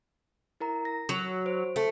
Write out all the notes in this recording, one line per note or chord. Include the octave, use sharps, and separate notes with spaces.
E4 A#4 A#5
A#6
F#3
C5
A3